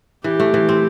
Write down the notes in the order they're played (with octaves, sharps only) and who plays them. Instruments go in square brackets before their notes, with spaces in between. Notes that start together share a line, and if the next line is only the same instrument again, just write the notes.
[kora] E3 [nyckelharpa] G4
[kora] A3
E3
C4